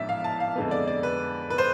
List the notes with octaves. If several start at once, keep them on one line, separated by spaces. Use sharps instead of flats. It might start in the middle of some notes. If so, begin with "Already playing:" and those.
Already playing: A1 G#2 F3 B3 D4 D5 E5
F5
A5
F5
F2 D3 G#3 B3
D5
D5
B4
B4
C5